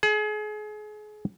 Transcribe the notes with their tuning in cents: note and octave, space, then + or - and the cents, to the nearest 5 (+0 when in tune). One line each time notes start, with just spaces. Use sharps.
G#4 +35